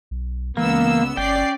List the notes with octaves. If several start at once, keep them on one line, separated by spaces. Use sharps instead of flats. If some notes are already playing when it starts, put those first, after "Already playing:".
B1
C#2 E3 A#3 B3 E6
G1 C#4 D5 G5 C7